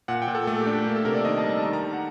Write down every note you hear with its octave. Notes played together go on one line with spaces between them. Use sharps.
A#2 F#5
G5
A#2
A4
A3 A4
G4
D4
G4
A#3
A4
C3 A#4
D5
D#3 D#5
A5
G3
A5
D#3 A#5
A#5
D#3 A5
F#5